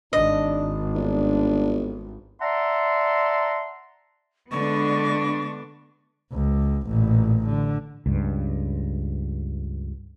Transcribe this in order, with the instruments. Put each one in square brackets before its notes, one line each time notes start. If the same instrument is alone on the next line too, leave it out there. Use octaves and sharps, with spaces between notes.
[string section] G#1 [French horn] D4 [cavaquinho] D#5
[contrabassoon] G1 [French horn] D4
[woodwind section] D5 E5 F#5 A5 A#5 C6
[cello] D3 G#3 [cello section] B3 D4 [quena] C#6
[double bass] C#2
A1 A#2
D3
[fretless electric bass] C#2 G2